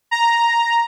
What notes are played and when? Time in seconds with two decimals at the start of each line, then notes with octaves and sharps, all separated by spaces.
0.11 A#5